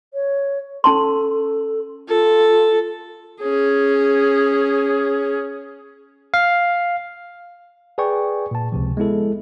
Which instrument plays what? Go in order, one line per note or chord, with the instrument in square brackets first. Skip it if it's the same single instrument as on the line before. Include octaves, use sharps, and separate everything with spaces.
[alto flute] C#5
[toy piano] C#4 A5 C6 [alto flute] A4
[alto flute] F4 [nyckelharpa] A4
[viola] C#4 G#4
[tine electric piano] F5
G#4 B4 D5 G5 G#5 C#6
A#2 A5
C#2 C3 F3
G#3 B3 E4 A4